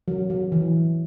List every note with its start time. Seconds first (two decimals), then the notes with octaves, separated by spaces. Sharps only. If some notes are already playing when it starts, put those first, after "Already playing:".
0.08 F#3
0.30 F#3
0.52 E3